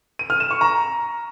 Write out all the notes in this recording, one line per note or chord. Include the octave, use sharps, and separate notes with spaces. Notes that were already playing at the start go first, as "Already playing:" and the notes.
D#7
F6
E7
C#6
A#5